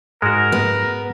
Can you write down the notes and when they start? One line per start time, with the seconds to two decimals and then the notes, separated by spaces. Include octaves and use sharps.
0.22 G#2 G#3 F#4 A#4
0.52 B3